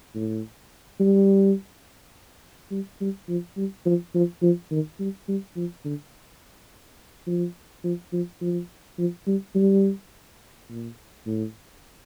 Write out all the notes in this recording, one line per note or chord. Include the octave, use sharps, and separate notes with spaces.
A2
G3
G3
G3
F3
G3
F3
F3
F3
D#3
G3
G3
F3
D3
F3
F3
F3
F3
F3
G3
G3
A#2
A2